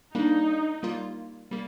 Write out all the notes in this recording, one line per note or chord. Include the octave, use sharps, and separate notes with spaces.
G3 A#3 D4 D#4
G3 A#3 F4
G3 A#3